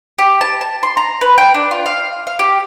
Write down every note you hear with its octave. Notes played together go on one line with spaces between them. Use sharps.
G4
A5
A5
C6
A#5
B4
G5
D4
F4
F5
F5
G4